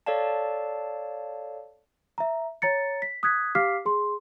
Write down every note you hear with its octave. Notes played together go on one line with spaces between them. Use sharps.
A4 C#5 D5 F5 A5
E5 A#5
C#5 A#5 A6 C#7
B6
D#6 F#6 G#6 B6
G4 F5 D6 F6 B6 C7
G#4 C6